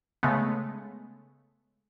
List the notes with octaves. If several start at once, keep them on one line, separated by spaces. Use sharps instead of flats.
C#3 G#3 A3 B3